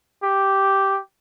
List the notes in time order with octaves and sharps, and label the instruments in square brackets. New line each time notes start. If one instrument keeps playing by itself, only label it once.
[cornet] G4